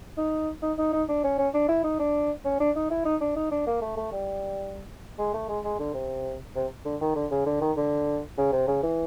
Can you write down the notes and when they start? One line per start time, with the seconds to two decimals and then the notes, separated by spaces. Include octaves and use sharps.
0.17 D#4
0.62 D#4
0.78 D#4
0.93 D#4
1.09 D4
1.24 C#4
1.38 C#4
1.54 D4
1.68 E4
1.84 D#4
1.99 D4
2.45 C#4
2.60 D4
2.76 D#4
2.90 E4
3.05 D#4
3.21 D4
3.36 D#4
3.51 D4
3.67 A#3
3.82 A3
3.97 A3
4.12 G3
5.19 G#3
5.34 A3
5.48 G#3
5.64 G#3
5.79 D3
5.94 C3
6.56 C3
6.85 D3
7.01 D#3
7.16 D3
7.31 C#3
7.46 D3
7.61 D#3
7.77 D3
8.37 C#3
8.52 C3
8.68 C#3
8.83 E3